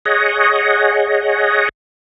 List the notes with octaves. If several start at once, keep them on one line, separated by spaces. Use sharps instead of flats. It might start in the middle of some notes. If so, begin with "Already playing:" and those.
G#4 C#5 D#5 F#5